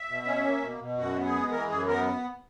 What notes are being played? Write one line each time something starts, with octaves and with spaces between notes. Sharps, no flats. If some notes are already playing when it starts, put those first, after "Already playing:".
Already playing: E5
B2
C#4
A#3
B2
B2
F#2 F#4
B3
G#4
G#3
E3 A#4
F#2 G#4
B3 A#4